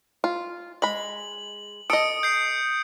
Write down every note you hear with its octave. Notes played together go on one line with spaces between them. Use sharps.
F4
G#3 B5 F#7
A4 D#5 D#6 C#7 D7
G6 C7